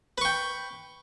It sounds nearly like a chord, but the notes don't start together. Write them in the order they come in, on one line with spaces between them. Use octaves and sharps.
B4 C#6 G5